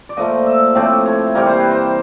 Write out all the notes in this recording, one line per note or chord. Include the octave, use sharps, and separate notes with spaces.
D5
A#2 F3 A3 D#5
E5
A2 F3 A3 C4 D5
C#5
C3 E3 G3 A#3 C#5
C5
B4
C5